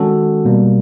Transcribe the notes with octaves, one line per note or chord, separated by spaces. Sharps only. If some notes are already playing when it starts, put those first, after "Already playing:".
Already playing: D#3 G#3 C#4 F#4 A4
B2 G3 A#3